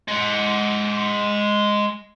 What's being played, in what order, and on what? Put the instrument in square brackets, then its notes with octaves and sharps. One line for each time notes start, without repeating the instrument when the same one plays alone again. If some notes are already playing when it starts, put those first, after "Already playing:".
[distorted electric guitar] G#3 F#5